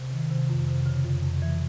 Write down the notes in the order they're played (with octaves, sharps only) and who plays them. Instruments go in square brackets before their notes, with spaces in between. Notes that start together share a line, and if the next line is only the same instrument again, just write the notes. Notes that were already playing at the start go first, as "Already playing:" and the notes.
Already playing: [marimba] C3
D#3
C3
F2
C3
C#3
F2
F2
E3